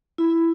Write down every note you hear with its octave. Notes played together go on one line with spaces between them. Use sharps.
E4